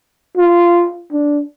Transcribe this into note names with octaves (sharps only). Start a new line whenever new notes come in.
F4
D4